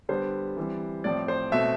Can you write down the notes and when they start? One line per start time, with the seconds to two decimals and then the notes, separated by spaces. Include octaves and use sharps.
0.09 D3 G3 B3 C5
0.57 E3 G3 C4
1.04 A2 F3 C4 D5
1.28 C5
1.52 B2 A3 C4 E5